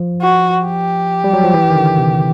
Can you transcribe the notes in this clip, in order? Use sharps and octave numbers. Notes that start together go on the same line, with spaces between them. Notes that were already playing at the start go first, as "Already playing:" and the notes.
Already playing: F3
F#4
G4
G3
F#3
F3
E3
D#3
D3
C3